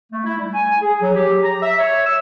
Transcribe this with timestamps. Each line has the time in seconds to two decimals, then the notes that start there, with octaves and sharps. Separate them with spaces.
0.12 A3
0.25 E4
0.39 G3
0.53 G#5
0.81 G#4
1.01 F#3
1.15 G4
1.43 A#5
1.62 E5
1.79 C#5
2.06 E6